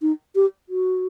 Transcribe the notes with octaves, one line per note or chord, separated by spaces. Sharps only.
D#4
G4
F#4